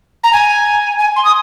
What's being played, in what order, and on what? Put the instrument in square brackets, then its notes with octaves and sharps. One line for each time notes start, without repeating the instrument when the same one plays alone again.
[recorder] A#5
G#5
G#5
C6
D#6